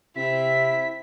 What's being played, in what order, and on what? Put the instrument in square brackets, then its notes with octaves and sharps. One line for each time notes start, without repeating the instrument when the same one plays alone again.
[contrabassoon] C3 [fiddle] C4 E5 [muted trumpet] E4 [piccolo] B6